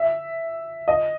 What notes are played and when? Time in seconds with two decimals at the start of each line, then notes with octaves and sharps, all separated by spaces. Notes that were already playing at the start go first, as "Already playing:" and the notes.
Already playing: E5
0.88 D#5